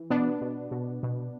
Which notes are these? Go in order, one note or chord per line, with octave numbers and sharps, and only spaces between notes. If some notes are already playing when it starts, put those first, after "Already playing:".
Already playing: E3
B2 B3 D4
B2
B2
B2